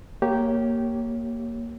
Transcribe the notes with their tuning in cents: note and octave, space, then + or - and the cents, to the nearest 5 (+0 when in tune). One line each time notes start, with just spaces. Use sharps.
A#3 +0 G4 -15 C#5 +0